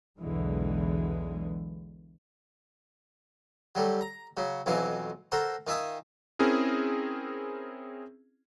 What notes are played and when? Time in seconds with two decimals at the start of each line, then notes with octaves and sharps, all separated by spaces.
0.18 B1 E2 B2 D3 E3 G#3
3.75 F#3 G3 A3
4.01 A#5
4.37 C#3 F#3
4.66 B1 F2 E3 F#3 F5 G#5
5.32 F#4 A4 A#4 C5
5.67 D#3 F4 E5 G#5 D#6
6.39 C4 C#4 E4 G#4 A#4